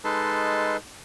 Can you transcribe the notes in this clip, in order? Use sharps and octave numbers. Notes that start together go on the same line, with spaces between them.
G#3 D#4 A4 B4 A5 C6